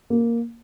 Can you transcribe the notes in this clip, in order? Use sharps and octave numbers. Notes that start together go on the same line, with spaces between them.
A#3